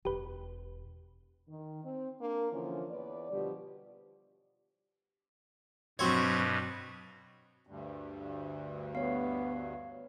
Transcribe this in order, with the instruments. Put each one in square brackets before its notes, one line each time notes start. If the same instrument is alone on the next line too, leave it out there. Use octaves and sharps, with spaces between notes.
[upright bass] E1 [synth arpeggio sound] G4 B4
[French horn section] D#3
C4
A#3 D4 A#4
D3 E3 F3 A#3 C#4
E2 B4 C#5 D5
B2 D3 F3 G3 G4
[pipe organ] G2 B2 [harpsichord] F#3 C4 C#5
[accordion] D2 G2
[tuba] B3 [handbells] C#5 F5